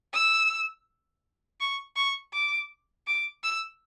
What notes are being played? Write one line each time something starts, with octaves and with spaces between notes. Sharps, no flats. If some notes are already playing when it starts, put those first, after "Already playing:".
E6
C#6
C#6
D6
D6
E6